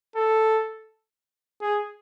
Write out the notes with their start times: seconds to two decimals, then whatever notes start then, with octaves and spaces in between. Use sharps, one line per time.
0.16 A4
1.61 G#4